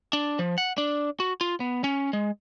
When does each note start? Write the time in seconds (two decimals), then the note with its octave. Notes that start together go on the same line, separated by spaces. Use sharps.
0.13 D4
0.39 F3
0.58 F#5
0.78 D4
1.20 F#4
1.41 F4
1.60 B3
1.84 C#4
2.13 G#3